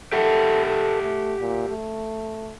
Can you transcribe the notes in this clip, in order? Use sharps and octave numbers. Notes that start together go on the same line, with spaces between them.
G4 A4 E5 F#5
A4
A3
A#2
A3